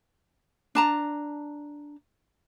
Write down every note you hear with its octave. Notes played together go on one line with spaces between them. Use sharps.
D4 A5 A#5